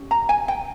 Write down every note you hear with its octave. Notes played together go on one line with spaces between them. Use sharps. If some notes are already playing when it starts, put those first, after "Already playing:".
Already playing: C#4 G4
A#5
G#5
G5